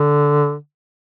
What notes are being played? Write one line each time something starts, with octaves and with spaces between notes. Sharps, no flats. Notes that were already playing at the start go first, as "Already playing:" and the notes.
Already playing: D3